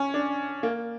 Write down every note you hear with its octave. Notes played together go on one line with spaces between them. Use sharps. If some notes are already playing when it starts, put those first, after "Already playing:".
Already playing: C#4
D4
A#3